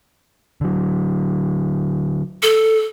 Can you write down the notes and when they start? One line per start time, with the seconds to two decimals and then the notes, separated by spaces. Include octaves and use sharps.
0.61 D3 F#3
2.43 A4